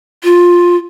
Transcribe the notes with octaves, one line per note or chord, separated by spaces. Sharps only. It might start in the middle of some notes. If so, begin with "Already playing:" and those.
F4